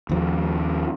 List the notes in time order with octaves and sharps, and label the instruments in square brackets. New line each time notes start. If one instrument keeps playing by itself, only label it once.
[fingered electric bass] D#2 F3